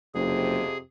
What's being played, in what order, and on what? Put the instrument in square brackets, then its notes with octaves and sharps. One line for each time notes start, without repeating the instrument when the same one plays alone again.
[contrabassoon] F#1 [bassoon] F2 [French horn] C3 [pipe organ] G#4